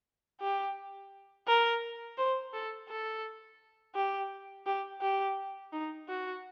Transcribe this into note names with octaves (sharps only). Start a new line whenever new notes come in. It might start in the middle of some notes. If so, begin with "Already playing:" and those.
G4
A#4
C5
A4
A4
G4
G4
G4
D#4
F#4